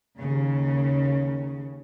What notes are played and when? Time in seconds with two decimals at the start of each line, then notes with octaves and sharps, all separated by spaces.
0.19 D#2 C#3